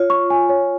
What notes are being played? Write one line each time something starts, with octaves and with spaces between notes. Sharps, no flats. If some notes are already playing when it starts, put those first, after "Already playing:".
Already playing: F4 C#5
C#6
G#5
C#5